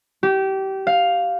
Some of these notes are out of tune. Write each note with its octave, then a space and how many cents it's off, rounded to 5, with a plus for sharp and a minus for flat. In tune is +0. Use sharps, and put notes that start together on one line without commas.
G4 -25
F5 +5